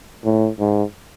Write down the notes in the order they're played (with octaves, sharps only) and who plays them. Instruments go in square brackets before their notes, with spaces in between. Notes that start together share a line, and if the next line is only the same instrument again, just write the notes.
[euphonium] A2
G#2